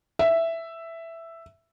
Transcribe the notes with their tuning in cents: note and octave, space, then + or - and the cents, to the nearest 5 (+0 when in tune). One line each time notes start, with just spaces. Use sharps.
E5 +5